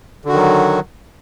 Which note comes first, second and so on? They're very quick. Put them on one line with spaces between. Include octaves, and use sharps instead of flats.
D3 F#4 D#3 F#3